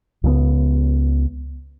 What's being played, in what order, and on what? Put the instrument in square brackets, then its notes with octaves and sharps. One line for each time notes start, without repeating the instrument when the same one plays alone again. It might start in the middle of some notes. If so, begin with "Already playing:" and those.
[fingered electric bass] C#2 C#3 F3 B3